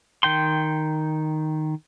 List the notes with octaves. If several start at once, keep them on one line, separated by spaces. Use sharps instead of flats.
D#3 G5 C6